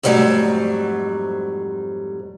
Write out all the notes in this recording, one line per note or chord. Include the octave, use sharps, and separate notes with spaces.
F2 G#2 F#3 G3 A3